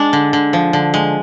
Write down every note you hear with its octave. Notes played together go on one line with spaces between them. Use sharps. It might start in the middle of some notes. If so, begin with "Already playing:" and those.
Already playing: G#3 D4
D3
D3
F3
D3
G#3